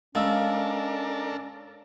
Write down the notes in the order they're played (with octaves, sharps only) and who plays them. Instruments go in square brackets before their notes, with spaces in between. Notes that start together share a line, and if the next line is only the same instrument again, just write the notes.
[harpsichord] G#3 [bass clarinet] C#4 [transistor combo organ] D4 A4 A#4 [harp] F5 E6